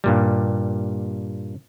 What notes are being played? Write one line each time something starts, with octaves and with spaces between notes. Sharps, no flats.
G2 A#2 G3